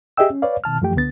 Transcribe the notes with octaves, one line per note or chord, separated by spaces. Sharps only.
G4 G#4 D#5 E5 G5 E6
C#4
B4 C#5 D5 F5
B2 D#3 A5 F6
F#2 E3 F3 A3 G4 G5
C#2 D3 B3 A6